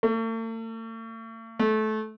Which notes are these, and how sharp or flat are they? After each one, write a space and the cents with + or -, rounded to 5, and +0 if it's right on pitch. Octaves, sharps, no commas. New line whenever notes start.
A3 +45
A3 -20